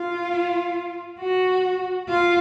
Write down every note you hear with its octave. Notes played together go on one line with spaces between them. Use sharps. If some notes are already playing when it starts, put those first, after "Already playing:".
Already playing: F4
F#4
F4